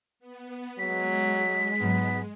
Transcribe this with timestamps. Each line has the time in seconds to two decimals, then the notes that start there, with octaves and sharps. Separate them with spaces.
0.19 B3
0.79 F#3 G#3 B6
1.80 G#2 F#3 B3